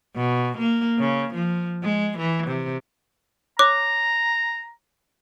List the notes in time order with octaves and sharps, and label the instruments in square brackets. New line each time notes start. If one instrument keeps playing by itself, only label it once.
[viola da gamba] B2
A#3
C#3
F3
G#3
E3
C3
[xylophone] C#5 D6 F#6 [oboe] A#5